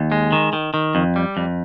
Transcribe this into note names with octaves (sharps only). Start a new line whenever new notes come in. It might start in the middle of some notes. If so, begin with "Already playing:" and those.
Already playing: D#2
G#3
D#3
D#3
D#3
F2
G3
F2